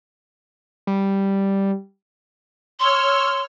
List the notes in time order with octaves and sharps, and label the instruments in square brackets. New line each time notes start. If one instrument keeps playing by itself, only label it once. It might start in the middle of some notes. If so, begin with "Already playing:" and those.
[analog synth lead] G3
[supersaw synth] C#5 E6 F6 [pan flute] C6